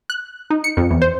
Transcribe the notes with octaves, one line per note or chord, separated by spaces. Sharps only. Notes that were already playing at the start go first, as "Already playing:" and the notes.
F#6
D#4
C#7
F2
E2
C5